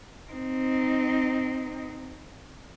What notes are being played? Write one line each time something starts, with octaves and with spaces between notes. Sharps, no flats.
C4 D#4